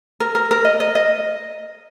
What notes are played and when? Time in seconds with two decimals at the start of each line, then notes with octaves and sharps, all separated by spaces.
0.20 A#4
0.35 A#4
0.51 A#4
0.65 D#5
0.80 D#5
0.95 D#5